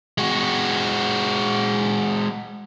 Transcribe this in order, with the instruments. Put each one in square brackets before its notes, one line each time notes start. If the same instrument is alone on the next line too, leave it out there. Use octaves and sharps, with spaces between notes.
[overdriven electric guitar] G#3 F#4